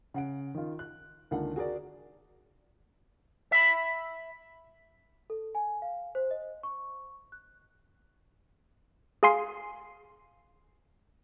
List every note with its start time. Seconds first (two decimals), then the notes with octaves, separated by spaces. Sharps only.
0.14 C#3 F#5 D7
0.55 D#3 D#4 F4
0.79 F#6
1.31 C#2 D3 D#3 A#3 F#5
1.56 F#4 G#4 A#4 D5
3.52 E5 B5
5.30 A4
5.55 G#5
5.82 F5
6.15 C5
6.31 D#5
6.63 C#6
7.32 F#6
9.23 G#4 F5 G#5 C6 C7